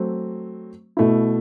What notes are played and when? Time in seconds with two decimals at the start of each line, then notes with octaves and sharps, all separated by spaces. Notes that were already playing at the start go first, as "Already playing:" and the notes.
Already playing: F#3 A3 C4
0.97 B2 A3 E4